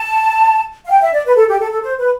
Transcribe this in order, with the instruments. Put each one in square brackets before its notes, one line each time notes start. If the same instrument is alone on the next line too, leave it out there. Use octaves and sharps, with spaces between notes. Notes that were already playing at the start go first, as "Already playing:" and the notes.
Already playing: [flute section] A5
F5
G5
E5
D5
B4
A4
G4
A4
A4
C5
B4